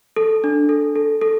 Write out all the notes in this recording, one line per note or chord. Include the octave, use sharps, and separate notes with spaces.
A4
D4
A4
A4
A4